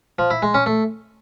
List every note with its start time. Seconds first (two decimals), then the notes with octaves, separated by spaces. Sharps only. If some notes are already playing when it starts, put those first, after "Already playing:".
0.19 F3
0.30 E4
0.42 G#3
0.54 C#4
0.66 A3